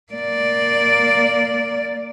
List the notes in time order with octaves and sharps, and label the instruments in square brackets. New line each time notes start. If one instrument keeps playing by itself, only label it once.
[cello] A#3 D5